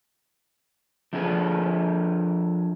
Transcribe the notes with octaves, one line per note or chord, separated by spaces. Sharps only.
F3 D4 G#4 A4 B4